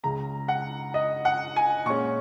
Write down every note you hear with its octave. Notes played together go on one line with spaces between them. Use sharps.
C#2 C#3 G#3 A#5
F#5
D#5
F#5
G#5
A#2 G#3 C#4 C#6